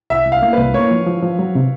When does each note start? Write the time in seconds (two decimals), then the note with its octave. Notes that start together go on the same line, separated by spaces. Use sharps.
0.10 C2 E5
0.26 C2
0.32 F5
0.42 A#3
0.53 B4
0.58 C2
0.74 A#3 C#5
0.91 F3
1.06 F3
1.23 F3
1.39 F#3
1.55 C3